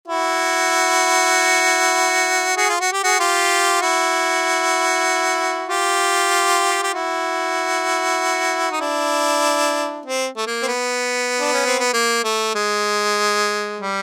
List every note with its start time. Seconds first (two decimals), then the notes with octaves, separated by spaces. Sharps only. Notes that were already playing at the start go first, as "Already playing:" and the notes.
0.08 E4 F#4
2.57 F#4 G#4
2.69 F4
2.80 F#4
2.93 G4
3.04 F#4 G#4
3.19 F4 G4
3.81 E4 F#4
5.69 F4 G4
6.83 G4
6.93 E4 F#4
8.71 D#4
8.80 D4 E4
10.06 C4
10.36 A3
10.46 A#3
10.62 C4
10.68 B3
11.40 D4
11.53 C#4
11.66 C4
11.79 B3
11.93 A#3
12.24 A3
12.55 G#3
13.80 G3